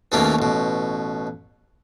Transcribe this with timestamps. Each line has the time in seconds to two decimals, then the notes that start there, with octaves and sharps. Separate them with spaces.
0.12 D#2 G#2 B2 A3 A#3 C#4
0.39 A1 B2